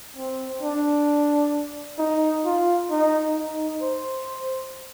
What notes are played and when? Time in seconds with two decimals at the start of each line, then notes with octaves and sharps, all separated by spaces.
0.16 C4
0.62 D4
1.99 D#4
2.45 F4
2.91 D#4
3.36 D#4
3.82 C5